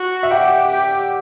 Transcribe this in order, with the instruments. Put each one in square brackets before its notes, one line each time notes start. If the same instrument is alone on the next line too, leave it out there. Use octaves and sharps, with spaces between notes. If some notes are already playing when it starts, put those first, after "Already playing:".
Already playing: [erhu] F#4
[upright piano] E5
[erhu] G4 [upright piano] F#5
[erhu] G4